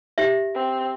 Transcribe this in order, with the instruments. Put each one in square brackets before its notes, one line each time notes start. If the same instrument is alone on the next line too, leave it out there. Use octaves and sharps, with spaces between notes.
[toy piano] G4 E5
[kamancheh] C4